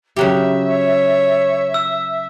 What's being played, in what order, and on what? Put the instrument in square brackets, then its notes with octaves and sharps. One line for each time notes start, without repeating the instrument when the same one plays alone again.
[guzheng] C#3 F#3 G4 [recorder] E5
[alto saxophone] C#5
[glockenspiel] E6